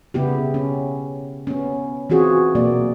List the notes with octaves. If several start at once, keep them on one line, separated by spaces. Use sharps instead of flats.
C#3 B3 E4 G4
C#4
B3 C#4
E3 C4 F4 F#4 G#4
B2 F#3 A#3 D5